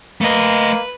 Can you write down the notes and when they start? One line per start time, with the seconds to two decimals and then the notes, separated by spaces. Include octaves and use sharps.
0.21 A3 A#3 B4 D#5